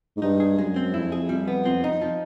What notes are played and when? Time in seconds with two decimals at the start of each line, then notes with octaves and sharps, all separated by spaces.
0.17 G#2
0.22 G2 D#4
0.40 G#4
0.58 F#2 G#3
0.76 C4
0.94 F2 E4
1.12 G#4
1.29 F2 G3
1.48 B3
1.65 F2 C4
1.84 D#4
1.92 F2
2.02 F3